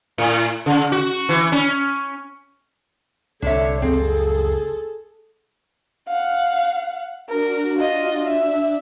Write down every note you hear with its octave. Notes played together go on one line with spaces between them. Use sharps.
A2
C#3
F#4
E3
C#4
C2 D3 D4 C#5 E5
F#1 C#2 F3 C4 G#4 A4
F5 F#5
D4 F#4 A#4
F4 D#5
D4 E5